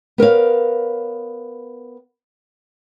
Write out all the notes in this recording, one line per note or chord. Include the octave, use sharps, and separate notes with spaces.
B3 A#4 C#5 F5